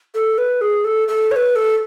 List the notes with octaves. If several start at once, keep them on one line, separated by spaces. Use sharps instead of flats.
A4
B4
G#4
A4
A4
C#5
B4
A4